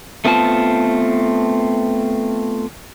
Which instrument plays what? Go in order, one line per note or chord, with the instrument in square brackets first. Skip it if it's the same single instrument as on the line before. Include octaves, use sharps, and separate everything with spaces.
[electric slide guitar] A3 B3 C4 F4 A5